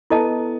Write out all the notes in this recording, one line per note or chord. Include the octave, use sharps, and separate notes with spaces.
B3 E4 A4 D#5 A5